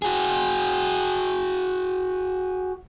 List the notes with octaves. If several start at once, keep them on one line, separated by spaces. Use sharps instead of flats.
F#4 G#4